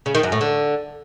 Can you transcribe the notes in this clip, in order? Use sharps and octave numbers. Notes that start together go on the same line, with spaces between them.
C#3
D#3
F#2
A2
D3